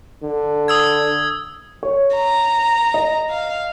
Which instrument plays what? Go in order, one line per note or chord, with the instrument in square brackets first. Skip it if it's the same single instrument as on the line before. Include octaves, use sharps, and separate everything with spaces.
[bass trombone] D3
[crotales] D#6 E6 G#6
[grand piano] C#5
[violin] A#5
[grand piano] D#5
[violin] F5